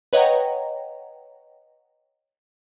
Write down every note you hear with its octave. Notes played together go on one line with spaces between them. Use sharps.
B4 C#5 D#5 F#5 G5 A#5